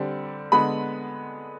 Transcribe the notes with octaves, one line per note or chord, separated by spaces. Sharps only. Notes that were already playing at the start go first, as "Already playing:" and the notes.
Already playing: D3 G3 C4
D3 G#3 B3 B5